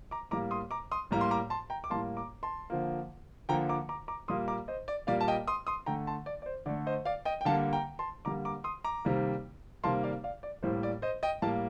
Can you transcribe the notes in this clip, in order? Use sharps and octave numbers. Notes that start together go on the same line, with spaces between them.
A#5 D6
A2 G3 A#3 A#5 D6
C6 D#6
A#5 D6
C6 D#6
A2 G3 A#3 A#5
C6
A#5 D6
A5 C6
G5 A#5
D6
A2 G3 A#3 A5 C6
A#5 D6
A5 C6
D3 F3 A#3
D3 F3 A#3 G5 A#5
A#5 D6
A#5 D6
A#5 D6
A#2 G3 A#3 C6 D#6
A#5 D6
C5 D#5
D5
A#2 G3 A#3 D5 F5
A5
D#5 G5
C6 D#6
C6 D#6
D3 A3 G5 A#5
A5 C6
D5
D5
C5
D3 A3 D5
C5 D#5
D5 F5
D#5 G5
G5
D3 G3 A#3 F5 A5
G5 A#5
A5 C6
D3 G3 A#3 A#5 D6
A#5 D6
C6 D#6
A#5 D6
C3 D#3 G3 A#3
C3 D#3 G3 A#3 A5 C6
D5 F5
D5 F5
D5
A2 G3 A#3 C5
D5
C5 D#5
D#5 G5
A2 G3 A#3 F5 A5